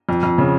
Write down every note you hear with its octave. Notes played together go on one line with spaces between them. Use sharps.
F2
F2
C#3